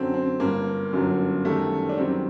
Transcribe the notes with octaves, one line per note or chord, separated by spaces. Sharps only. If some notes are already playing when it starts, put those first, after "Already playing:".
Already playing: F#2 D3 F#3 C4
C4
G1 G2 D3 A#3
G1 F#2 D3 F#3
F#2 D#3 G3 A3
D4
F#2 D#3 G3 C4